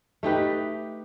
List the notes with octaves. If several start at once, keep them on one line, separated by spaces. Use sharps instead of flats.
A3 D#4 G4 B4